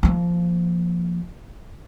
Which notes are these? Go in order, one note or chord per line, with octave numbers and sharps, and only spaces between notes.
F3 A#3